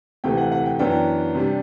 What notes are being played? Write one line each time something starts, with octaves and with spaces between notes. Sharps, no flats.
D2 C3 E3 A3 G5
F#5
F#5
G5
F#2 E3 B3 D4 G5
C3 G3 D4